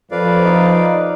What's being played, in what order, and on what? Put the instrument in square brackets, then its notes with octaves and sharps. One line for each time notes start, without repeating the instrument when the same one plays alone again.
[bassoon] F2 [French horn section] F3 [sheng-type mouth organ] B4 D5 F5
[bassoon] D#4